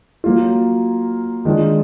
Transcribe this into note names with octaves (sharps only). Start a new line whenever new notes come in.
F#3 A#3 F4
D#3 G#3 D4 F4